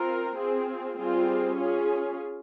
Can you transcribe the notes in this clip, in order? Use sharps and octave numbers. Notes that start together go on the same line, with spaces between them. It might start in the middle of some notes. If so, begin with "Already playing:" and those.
Already playing: C4 F4 A#4
C4 F4 G#4
G3 C4 F4 G#4
C#4 F4 G#4